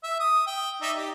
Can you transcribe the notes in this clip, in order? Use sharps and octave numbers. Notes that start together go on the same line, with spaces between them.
E5
D#6
G5
D#4 D5 E5
G4